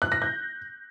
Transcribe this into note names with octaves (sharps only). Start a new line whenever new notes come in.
F#6
A#6
G6